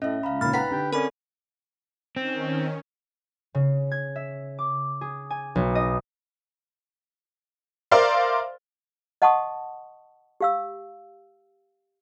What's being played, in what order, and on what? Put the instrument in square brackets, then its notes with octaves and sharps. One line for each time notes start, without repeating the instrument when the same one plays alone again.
[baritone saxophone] A2 [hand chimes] C#4 E5 [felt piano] D#5
[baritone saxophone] C#2 [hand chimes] F5 A#5 B5
[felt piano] A#2 C#3 [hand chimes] D#4 A6 [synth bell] B5 F6
[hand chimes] B4 B5 F#6 [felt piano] F#5 A#5 [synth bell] G5 B6
[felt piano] D3 [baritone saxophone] G4
[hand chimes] C4 A4 D5 [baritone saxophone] C#4 [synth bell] A#4 B5
[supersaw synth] D#3 C#4 [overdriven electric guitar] C4
[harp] C#3
G#6
E5
D6
G#4
G#5
B1
D#5
[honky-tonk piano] A#4 C5 D5 E5 F5 C6
[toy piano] D#5 F#5 A5 C6 C#6 D#6
G4 F5 E6